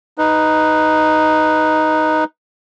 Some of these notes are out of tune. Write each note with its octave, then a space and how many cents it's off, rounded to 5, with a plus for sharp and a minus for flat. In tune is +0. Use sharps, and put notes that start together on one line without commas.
D#4 +0 B4 +0